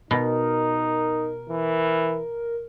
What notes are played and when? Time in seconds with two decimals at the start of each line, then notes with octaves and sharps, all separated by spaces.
0.11 B2 D#4 A#4
1.50 E3